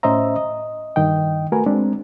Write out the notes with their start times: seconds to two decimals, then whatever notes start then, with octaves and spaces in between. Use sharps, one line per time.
0.03 A2 C#4 C5 D#5 E5 A#5
0.36 D#5
0.96 G2 D#3 D#5 G5
1.52 A3 F#4 A#4 B4 G#5
1.66 G#3 C4 D4